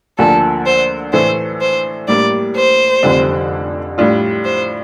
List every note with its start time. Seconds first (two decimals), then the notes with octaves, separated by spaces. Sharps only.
0.18 D2 D3 F3 A#3 D4 A4
0.66 C5
1.13 A2 E3 A3 D4 A4 C5
1.61 C5
2.08 A2 G3 A#3 D4 D5
2.56 C5
3.03 F1 F2 D3 G3 D4
3.98 A2 G3 D4 F4
4.45 C5